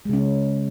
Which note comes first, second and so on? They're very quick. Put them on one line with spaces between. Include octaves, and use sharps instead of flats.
G#3 C#3 C#4